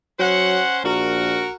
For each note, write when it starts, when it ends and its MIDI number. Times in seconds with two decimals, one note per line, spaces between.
0.19 0.63 54
0.19 0.80 61
0.19 0.80 72
0.19 0.80 78
0.84 1.47 34
0.84 1.53 66
0.84 1.53 70